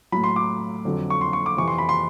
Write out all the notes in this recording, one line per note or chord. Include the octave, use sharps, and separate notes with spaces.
A2 F#3 B5
C6
D6
F2 D3 F#3
C#6
C6
C#6
D6
F2 C3 E3 C#6
C6
B5
C6